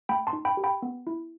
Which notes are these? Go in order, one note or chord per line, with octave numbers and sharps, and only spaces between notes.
A3 G5 B5
A5 C6
D#4
G5 B5
G4
G5 B5
B3
E4